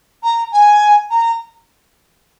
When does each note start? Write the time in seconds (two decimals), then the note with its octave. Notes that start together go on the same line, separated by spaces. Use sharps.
0.23 A#5
0.52 G#5
1.11 A#5